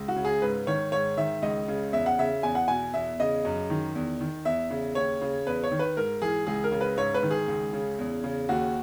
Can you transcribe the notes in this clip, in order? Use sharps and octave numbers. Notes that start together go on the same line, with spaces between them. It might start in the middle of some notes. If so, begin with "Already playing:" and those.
Already playing: C#2
F#4
C#3
G#4
G#2 B4
D#3 C#5
G#2 C#5
D#3 E5
C#2 D#5
C#3
E2 E5
F#5
C#3 E5
E2 G#5
F#5
B2 G#5
E2 E5
C#3 D#5
F#2
D#3
E2
D#3
E2 E5
C#3
D#2 C#5
C#3
E2 B4
C#5
D#3
B4
G#2 A#4
E3 G#4
C#2 G#4
A#4
C#3
B4
G#2 C#5
B4
D#3
G#4
C#2
C#3
E2
C#3
D#2 F#4